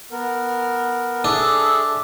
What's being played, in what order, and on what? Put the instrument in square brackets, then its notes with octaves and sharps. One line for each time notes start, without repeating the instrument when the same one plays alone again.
[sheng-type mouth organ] B3 A#4
[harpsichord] D4 [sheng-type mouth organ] G#4 A4 E5